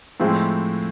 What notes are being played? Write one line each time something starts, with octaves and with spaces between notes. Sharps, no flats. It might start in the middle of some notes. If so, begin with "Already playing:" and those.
A2 F3 G#3 C4 E4